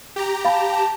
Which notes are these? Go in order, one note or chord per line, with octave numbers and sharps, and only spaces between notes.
G4 A#5
F5 A5 B5